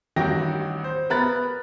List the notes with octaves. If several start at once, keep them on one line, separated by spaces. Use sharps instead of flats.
A1 G2 D#3 F#4 G5 A#6
C5
B3 A#4 B5 F#6 A6